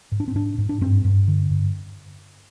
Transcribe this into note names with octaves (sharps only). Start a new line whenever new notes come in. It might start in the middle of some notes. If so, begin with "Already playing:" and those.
G#2
D4
C4
G#2 D4
G#2
D4
G2 C4
G2
D3
G2